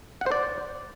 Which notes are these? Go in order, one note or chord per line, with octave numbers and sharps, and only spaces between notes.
F#5
C5
D5